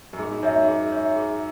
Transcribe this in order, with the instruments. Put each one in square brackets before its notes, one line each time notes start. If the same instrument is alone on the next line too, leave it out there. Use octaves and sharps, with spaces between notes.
[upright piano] F#2
[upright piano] G#2 [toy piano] G#4
[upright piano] G#2
[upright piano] F#2 [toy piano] C#5 E5
[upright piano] G#2
[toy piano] G#4
C#5 E5
G#4